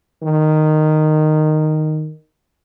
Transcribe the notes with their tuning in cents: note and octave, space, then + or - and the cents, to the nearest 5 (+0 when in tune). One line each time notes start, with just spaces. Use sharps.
D#3 -10